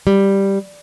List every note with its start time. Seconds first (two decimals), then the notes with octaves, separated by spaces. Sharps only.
0.07 G3